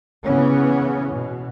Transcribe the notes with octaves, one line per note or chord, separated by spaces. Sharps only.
C#3 E3 B3 C#4
B2